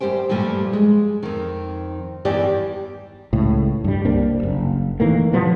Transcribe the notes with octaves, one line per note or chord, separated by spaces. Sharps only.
F#2 G3 G4 C5 G5
G2 A#2 F3 G3 A3
G#3
F2 D#3
E2 G2 D#3 E3 G4 D5
C#2 A2
G2 G3
C2 A#3 C4 D4
F#1
D#3 E3 A3 A#3
C3 F3 G3 B3